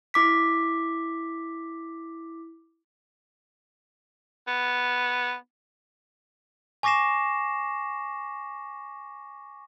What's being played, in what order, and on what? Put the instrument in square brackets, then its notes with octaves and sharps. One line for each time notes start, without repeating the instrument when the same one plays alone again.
[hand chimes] E4 D6 B6
[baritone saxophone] B3
[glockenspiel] G#5 C#6 D6 A#6 C7 E7